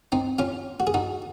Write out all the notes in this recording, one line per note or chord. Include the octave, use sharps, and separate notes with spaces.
C4 D#4
C#4 F4
F#4
G#4
D#4 F#4